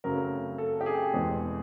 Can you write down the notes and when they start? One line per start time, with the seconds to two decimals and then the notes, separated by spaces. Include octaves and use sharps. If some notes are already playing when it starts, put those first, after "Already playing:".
0.04 F#2 C#3 F#3 A3 C4 A#4
0.58 A4
0.81 G4
0.86 G#4
1.13 E2 B2 G#3 C4